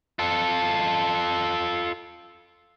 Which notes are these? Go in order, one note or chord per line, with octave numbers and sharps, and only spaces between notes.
F4 A4